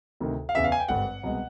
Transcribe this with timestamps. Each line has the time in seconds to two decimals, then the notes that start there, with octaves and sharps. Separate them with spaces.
0.20 D2 C3 D#3
0.49 F5
0.55 E2 C#3 E3 E5
0.64 F5
0.72 G#5
0.80 G5
0.88 G#1 G2 D3 G3 F#5
1.23 C2 B2 G#3